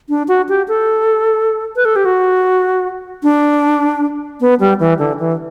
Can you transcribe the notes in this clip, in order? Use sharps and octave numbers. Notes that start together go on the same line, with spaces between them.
D4
F#4
G4
A4
B4
A4
G4
F#4
D4
B3
G3
E3
D3
E3